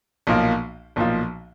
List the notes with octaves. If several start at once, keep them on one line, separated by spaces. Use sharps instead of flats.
B1 A#2 F3 A#3
B1 A#2 F3